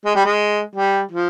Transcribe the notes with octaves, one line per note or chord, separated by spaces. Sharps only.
G#3
G3
G#3
G3
F3